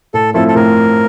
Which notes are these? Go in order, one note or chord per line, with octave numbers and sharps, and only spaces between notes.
A2 A4
F3 A3 C4 E4 A4
A4
A2 A#4